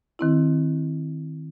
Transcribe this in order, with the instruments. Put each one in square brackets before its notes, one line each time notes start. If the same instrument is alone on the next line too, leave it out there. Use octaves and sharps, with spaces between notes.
[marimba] D#3 C4 E4